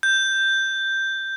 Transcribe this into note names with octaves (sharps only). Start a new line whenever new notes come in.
G6